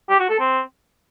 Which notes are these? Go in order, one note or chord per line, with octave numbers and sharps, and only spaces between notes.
G4
F#4
A4
C4